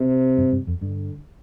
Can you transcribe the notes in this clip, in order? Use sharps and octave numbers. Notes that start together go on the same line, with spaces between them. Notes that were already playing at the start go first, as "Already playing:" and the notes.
Already playing: C3
G2
G2
F2
G2 D3